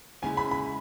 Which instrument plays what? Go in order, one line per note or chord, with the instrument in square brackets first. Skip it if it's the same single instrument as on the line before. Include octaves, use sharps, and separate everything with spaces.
[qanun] C#3 G#3 C#4 E4 [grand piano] G#5
[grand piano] B5
B5